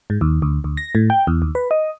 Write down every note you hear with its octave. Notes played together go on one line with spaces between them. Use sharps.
G#2
D#2
D2
D2
A#6
A2
G5
E2
D#2
B4
D#5